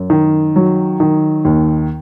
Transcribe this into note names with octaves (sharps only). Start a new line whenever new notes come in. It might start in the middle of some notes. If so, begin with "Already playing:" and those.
Already playing: F#2
D#3
F#3
D#3
D#2